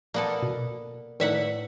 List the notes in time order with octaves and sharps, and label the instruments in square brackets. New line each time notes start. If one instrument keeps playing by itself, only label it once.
[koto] A#3 B3 A4 [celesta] D5
[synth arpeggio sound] B2
[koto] A2 E5 F#5 [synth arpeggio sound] D#3 A3 D#4 [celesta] B4 D5